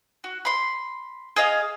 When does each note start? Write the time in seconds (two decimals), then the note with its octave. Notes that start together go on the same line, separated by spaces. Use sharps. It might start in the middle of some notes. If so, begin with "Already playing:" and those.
0.24 F#4
0.45 B5 C6
1.36 G#4 D#5 F5